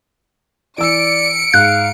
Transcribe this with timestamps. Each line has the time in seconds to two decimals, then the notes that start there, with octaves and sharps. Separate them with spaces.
0.78 E3 D5 E6 C#7 D7
1.54 G#2 F5 F#6